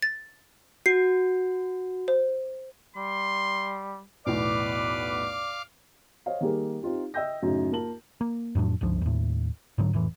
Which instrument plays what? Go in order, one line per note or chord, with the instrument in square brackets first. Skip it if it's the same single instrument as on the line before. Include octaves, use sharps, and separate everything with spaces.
[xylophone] A6
[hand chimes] F#4 [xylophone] C7
[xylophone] C5
[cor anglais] G3 [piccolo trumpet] C6
[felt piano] B1 E2 A2 [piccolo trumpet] B4 [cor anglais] D5 [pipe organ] F5 D6
[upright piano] C5 C#5 D#5 F5
D#3 G3 A#3 G4 G#4 A#4
C4 D#4 F4 G4
D#5 E5 G5 E6 G6 A#6
F#2 A2 C#3 F#3 C#4 D#4
A#3 F4 A#4 A5 F#7
[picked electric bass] A#3
F2 A2 F#3 D4
G1 C#2 G2 F3
D#2 A2
G#2 D3 F#3
F1 A2 E3